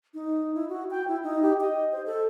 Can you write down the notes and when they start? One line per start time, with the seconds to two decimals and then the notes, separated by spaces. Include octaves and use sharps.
0.14 D#4
0.54 E4
0.69 F#4
0.91 G5
1.08 E4
1.23 D#4
1.42 G4
1.61 D#5
1.92 C5
2.06 A4